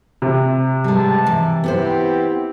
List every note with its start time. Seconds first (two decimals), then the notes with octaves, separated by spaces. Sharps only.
0.22 C3
0.84 B2 G3 G#3 A5
1.26 E3
1.64 B3 C4 E4 G4 A4 C5